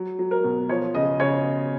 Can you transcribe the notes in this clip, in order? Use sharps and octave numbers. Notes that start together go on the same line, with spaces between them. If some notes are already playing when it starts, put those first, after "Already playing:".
Already playing: F#3
F#3
A#4
B2
F3 C#5
C#3 D#5
C#3 C#5